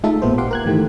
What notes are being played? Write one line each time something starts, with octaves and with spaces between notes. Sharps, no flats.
G#3 A3 D#4 F4 A4 E5
A1 A#2 B3 C5
G4 F5 F#5 C6 D6
A#4 F#6 G#6
G#2 D#3 E3 A3 G4